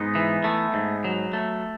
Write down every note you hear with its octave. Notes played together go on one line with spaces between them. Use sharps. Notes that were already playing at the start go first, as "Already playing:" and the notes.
Already playing: G#2 B3 D#4
E3
A3
G#2
F#3
A3